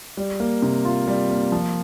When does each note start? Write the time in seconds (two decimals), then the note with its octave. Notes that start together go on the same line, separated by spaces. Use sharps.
0.17 G3
0.40 A#3
0.62 C3
0.85 F4
1.07 G3
1.30 A#3
1.52 F3